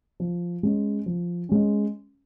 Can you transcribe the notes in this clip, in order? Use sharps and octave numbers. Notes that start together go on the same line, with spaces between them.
F3
G#3 C#4
F3
G#3 C#4